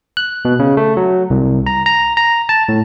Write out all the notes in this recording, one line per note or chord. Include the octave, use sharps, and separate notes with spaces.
F#6
B2
C#3
A3
F#3
C2
A#5
A#5
A#5
A5
A2